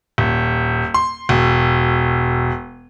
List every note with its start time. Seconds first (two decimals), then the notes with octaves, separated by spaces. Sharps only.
0.18 D#1
0.94 C6
1.29 E1